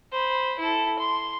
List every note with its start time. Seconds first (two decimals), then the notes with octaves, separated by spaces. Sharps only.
0.12 C5 B5
0.59 E4 A4
0.99 C6